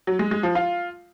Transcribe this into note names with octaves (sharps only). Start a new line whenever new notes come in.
F#3
G#3
G#3
F3
F4